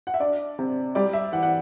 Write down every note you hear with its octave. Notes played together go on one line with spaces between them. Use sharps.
F#5
E5
D4 D5
C3
G3 D5
E5
E3 F#5
F#5